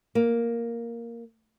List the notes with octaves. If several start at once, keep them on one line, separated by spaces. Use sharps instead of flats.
A#3